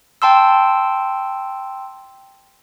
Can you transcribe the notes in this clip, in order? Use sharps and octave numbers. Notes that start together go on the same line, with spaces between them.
G5 A5 C6 E6